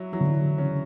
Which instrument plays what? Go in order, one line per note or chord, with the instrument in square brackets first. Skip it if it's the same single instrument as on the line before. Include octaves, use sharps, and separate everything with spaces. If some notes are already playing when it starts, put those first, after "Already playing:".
Already playing: [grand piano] F#3 E4
[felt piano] E3 [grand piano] F#3
[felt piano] D3
E3
[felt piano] C#3 [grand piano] C#4